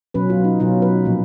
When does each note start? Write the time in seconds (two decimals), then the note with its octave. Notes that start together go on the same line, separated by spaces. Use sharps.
0.14 B2 F#3 C#4 B4
0.30 F4
0.44 D#4
0.60 B2 F#3 C#4 F4
0.82 B4
1.05 A#2 F3 A#3